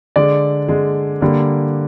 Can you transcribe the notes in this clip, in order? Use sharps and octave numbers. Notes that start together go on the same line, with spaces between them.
D3 G#3 D5
D3 G#3
D3 G3 A#3